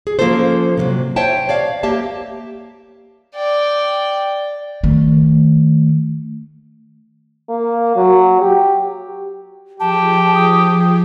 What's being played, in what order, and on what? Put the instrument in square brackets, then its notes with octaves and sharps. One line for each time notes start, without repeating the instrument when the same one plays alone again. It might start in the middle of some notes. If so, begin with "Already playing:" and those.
[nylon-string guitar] G#4
F3 A#3 C#4 F4 A4 C5
C3 F3 F#3
C5 C#5 E5 G5 A5
C#5 D5 F5
A#3 G4 E5 A5
[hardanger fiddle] D5 G5
[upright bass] D#3 A3
[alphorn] A#3
F#3
G4
[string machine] F3 G#4 G5 [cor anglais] G4 [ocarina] A5
[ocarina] D#6